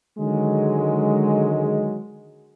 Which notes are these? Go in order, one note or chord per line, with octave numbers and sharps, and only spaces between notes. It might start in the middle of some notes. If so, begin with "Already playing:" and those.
D3 D#3 F#3 G#3